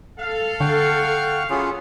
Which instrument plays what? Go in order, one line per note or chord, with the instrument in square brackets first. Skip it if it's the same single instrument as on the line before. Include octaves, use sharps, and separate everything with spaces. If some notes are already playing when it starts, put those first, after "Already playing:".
[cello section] A4 [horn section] F5
[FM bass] D3 [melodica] F#5 G5 C#6
[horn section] F#3 A3 B3 [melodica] C#4 F4 G#4